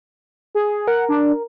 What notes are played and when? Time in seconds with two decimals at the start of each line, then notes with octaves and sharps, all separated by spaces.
0.55 G#4
0.87 A#4 F#5
1.09 D4